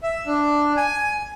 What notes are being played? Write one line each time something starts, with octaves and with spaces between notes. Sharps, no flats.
E5
D4
G#5